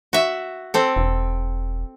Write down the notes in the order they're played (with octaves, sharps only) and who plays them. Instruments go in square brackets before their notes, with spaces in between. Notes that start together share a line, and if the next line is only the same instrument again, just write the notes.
[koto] F#4 E5
C4 A4
[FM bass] E1